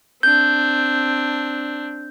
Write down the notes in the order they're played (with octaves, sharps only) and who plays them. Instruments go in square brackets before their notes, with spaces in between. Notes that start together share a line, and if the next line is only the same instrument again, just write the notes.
[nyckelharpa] C4 D4 [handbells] G6